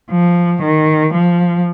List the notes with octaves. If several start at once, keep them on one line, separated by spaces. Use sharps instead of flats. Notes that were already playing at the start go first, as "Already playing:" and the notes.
F3
D#3
F3